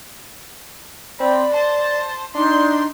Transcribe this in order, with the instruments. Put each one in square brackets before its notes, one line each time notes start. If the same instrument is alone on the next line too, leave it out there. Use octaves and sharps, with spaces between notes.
[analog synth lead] C4 [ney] D5 [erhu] B5
[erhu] C5 [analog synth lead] A5
[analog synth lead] D4 [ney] D#4 [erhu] C6